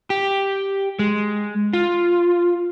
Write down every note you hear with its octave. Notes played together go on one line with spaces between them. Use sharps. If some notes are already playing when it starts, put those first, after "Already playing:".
G4
G#3
F4